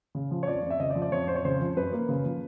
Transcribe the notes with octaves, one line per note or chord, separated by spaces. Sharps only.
C#3
F3
C#5
F2 D5
F2
E5
C#3 D#5
D5
F3
D5
F2 C#5
F2 C5
C#5
C#3 C5
F3
F#2 B4
A#3
C#3
F3